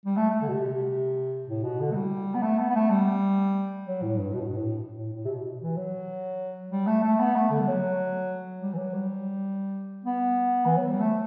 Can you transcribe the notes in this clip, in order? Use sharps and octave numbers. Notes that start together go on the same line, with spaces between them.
G3
A3
A3
D3
B2
C3
A2
B2
D3
A3
G3
B3
A3
B3
B3
A3
G3
F#3
A2
G2
B2
A2
G2
A2
A2
A2
C3
B2
E3
F#3
G3
A3
A3
B3
A3
D3
G3
F#3
G3
E3
F#3
G3
B3
E3
F#3
G3
A3